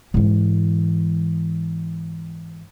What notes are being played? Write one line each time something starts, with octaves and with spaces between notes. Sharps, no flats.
G#2 E3